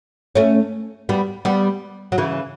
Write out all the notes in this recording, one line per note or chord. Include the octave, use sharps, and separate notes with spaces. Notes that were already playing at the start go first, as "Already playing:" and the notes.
A3 C#4
G3 B3
G3 B3
F#3
C#3 E3